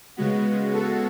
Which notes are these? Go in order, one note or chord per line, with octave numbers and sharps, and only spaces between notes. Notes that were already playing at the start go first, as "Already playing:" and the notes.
C#3 G#3 B3 F#4
F#4 A4